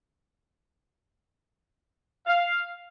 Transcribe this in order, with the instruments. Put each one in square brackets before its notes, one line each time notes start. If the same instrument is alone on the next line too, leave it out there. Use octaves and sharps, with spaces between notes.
[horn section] F5